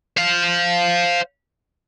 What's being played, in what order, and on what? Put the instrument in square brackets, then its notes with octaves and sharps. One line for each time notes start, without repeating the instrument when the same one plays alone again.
[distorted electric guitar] C5 F5